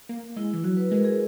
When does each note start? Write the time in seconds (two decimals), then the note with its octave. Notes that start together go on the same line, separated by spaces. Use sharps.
0.09 A#3
0.36 G#3 E4
0.54 E3
0.64 F#3 F#4
0.77 B4
0.90 G#3 A#4
1.04 G#4